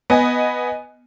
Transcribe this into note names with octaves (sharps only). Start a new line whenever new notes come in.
B3 D#5 G#5